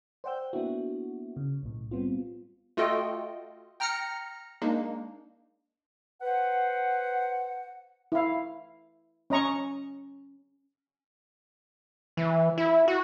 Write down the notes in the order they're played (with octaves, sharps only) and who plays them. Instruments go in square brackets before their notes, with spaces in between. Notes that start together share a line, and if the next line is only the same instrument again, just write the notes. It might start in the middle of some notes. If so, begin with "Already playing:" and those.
[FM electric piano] C5 D5 F#5 G5 E6 G6
A#3 B3 D4 E4 F#4
C#3
B1 A2
G3 B3 C4 F4
[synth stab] A3 F4 F#4 A4 D#5 G5
G5 A#5 F6 A#6 C#7
G#3 A#3 D4 D#4
[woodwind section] B4 C5 F#5
[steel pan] E4 F5
C#4 D#5 A#5 C#6
[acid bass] E3
E4
F#4